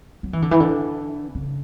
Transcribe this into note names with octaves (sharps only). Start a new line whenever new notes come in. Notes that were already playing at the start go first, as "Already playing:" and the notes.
F#3
E3
D3
E3
D3
C#3